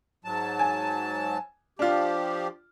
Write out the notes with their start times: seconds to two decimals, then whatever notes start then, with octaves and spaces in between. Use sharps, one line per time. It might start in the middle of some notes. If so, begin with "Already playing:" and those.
0.25 G#2 F#3 A5
0.59 G#5
1.79 F3 D4 F4 G4